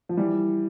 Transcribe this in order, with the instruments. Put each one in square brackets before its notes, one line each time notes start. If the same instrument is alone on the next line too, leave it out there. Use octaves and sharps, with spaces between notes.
[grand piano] F3
E3 G3